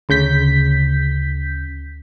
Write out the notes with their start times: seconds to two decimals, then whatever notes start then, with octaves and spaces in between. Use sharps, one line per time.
0.09 D2 C#3 G6 B6